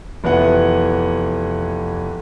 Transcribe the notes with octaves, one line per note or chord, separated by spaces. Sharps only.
F1 E3 B3 F#5